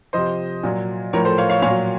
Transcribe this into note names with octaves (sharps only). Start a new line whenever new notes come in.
C3 F3 C5 D#5
A#2 F#3
A2 F3 A#4 C#5
A4 C5
C#5 F5
C#5 F5
A#2 F#3 C#5 F5